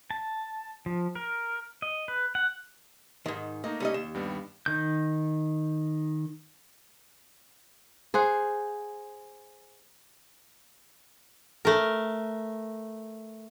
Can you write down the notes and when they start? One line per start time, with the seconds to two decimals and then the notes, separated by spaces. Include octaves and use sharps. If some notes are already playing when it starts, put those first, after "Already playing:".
0.11 A5
0.86 F3
1.15 A#4
1.82 D#5
2.08 B4
2.35 F#5
3.26 G#2 D#3
3.64 A3 A#3 D#4 D#5
3.80 G3 C#4 D#5
3.94 D#2 E7
4.15 G2 G3 B3
4.66 D#3 G6
8.14 G#4 C5 F#5
11.65 A3 A#4